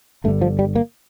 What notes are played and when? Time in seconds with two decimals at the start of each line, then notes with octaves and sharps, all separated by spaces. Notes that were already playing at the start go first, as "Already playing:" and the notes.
0.24 G1 G2 D3 A3
0.41 F3
0.59 G3
0.75 A#3